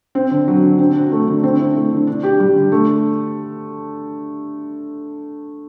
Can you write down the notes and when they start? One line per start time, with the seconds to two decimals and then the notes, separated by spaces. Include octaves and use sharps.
0.15 C4
0.31 D3
0.48 F#3
0.63 D3
0.79 C4
0.96 F#4
1.12 A3
1.28 D3
1.43 C4
1.59 E4
1.76 A3
1.92 D3
2.07 D4
2.23 G4
2.40 G3
2.56 D3
2.72 A3